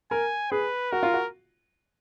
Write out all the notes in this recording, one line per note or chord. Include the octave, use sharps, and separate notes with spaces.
A#4 G#5
G#4 B4
F#4 A#4
F4
F#4